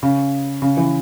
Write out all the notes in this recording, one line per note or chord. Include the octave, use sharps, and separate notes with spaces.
C#3
C#3
E3